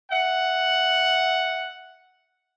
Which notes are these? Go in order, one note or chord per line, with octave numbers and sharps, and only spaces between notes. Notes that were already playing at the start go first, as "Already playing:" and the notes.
E5 F#5